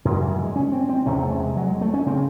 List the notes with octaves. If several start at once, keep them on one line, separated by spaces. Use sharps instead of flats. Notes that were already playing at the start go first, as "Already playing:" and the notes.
F#2 C#3 G#3
E3
G#3
C#4
C4
C4
E2 C3 C#4
A3
G#3
F#3
G#3
A3
C#4
C#3 C4